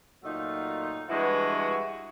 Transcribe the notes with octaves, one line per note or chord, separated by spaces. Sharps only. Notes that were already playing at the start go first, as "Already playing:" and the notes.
A#2 F#3 A3 D#4 F4
G2 E3 G#3 E4 F#4